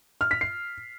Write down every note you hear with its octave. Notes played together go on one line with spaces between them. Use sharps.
F6
B6
C7